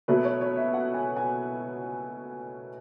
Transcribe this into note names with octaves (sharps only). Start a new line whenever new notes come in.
B2 F#3 A3 B4
C#5
C#5
E5
F#5
G#5
G#5